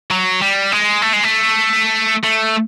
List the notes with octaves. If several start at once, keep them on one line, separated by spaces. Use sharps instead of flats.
F#3
G3
G#3
A3
G#3
A3
A3